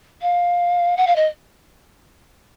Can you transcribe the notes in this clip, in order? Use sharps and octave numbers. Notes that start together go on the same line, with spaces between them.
F5
F#5
F5
D#5